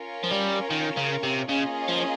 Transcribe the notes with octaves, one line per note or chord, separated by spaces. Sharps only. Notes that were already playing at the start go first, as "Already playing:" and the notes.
Already playing: C#4 F4 A#4 C#5
F3
G3
D#3
C#3
C3
C#3 A#3 C#4 F4 G#4 D#5
F3